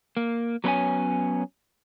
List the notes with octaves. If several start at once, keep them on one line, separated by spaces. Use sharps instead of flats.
A#3
F#3 B3 C#4 B4 C#5 G#5